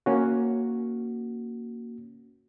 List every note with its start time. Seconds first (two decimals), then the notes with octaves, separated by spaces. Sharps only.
0.06 A#3 C#4 F#4